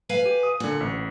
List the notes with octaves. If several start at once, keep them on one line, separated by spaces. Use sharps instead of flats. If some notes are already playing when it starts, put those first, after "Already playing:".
B4 F5 G#5
G4
D#6
A#2 D3 F#5
A1